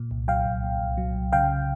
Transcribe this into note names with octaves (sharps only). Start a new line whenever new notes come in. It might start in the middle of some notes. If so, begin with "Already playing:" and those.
Already playing: A#2
C2
F#3 F5 G5
C2
A#2
C2
F#3
C2
C#3 F5 G5